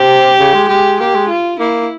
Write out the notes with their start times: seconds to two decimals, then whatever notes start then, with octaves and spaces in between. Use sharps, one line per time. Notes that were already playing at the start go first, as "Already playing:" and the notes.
Already playing: C3 G4
0.39 C#3
0.54 G#3
0.69 G#3 G4
1.00 A#3 G4
1.15 G#3
1.29 F4
1.59 A#3 E4